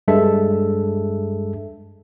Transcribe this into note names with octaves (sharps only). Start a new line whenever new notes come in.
G2 G#3 A4 E5